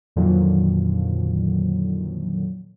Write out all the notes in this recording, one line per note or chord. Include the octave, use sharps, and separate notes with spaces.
F2 A#2 D3 D#3 F3 F#3